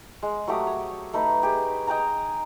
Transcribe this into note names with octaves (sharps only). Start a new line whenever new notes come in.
G#3
F#3 A3 G4 D#6
C#5
A3 D#4 B4
G4 G#4
D#5 G5 G#5 A#5